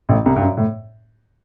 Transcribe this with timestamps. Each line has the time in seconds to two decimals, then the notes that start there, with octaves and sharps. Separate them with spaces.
0.09 A1 A2
0.26 C2 C3
0.36 G2
0.41 F#2
0.57 A2